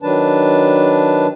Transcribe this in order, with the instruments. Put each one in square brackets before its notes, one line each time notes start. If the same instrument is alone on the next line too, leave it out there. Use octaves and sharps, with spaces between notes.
[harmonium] D#3 F#3 D4 B4 A5